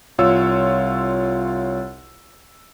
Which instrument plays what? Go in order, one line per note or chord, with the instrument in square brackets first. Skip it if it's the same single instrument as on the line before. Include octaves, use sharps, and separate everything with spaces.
[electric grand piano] C2 F4 C#5 E6